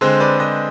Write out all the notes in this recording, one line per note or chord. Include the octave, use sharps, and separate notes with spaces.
D3 G#3 C4 G#4 C5
B4 D5
C5 D#5